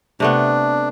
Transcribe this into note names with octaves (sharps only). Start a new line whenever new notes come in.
C3 A3 B3 D4